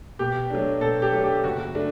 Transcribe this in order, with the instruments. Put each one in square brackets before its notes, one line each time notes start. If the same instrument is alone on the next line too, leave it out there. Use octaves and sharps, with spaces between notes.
[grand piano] B2 [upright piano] G4
[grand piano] F#3 A3 D4
[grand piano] B2 [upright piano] A4
[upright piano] G4
[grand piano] F#3 A3 D4
[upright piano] G4
[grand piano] F#1 [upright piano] F#4
[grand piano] A3 D4